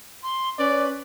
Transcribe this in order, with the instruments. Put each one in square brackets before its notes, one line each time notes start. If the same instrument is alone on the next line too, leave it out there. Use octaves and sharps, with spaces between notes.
[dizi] C6
[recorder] C#4 [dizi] B4 [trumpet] D5